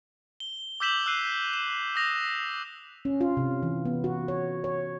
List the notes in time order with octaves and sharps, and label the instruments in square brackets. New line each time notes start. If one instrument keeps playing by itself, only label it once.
[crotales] G7
D6 E6 G6 B6 E7 F#7
E6 F#6 C7 D#7
E7
D#6 A#6 F7
[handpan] C#4
F4
C3
E3
B3
F#4
C#5
C#5